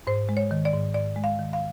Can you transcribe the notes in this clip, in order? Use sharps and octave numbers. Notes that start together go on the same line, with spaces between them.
G#2 C5
G#3
C#5
D#3
D5
G#2
G#2 D5
G#3
F5
D#3
F5